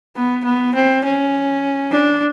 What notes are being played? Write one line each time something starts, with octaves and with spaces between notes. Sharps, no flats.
B3
B3
C4
C#4
D4